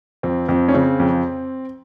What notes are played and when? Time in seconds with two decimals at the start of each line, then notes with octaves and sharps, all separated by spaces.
0.23 F2 C4
0.49 F2 C4
0.68 C#4
0.74 C#3 C4
1.00 F2